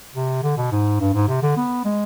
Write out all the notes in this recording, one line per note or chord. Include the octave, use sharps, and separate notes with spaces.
C3
D3
B2
G#2
G2
G#2
C3
D3
B3
G#3